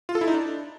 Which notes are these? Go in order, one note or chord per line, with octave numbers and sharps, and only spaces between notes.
F4
A4
E4
D#4
D4